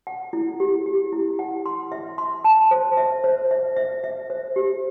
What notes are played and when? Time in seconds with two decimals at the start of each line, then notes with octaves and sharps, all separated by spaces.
0.07 F#5
0.33 E4
0.60 G4
0.86 G4
1.12 E4
1.39 F#5
1.66 C6
1.92 E5
2.18 C6
2.44 A5
2.71 C5
2.97 E5
3.24 C5
3.51 E5
3.77 E5
4.04 E5
4.30 C5
4.56 G4